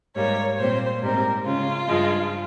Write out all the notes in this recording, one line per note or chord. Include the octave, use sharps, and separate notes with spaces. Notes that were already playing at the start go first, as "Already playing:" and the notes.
G#2 G3 A#3 C#5
A#2 G3 C4 C5
G#2 G3 C4 A#4
C#3 G#3 C#4 F4
G2 F3 G#3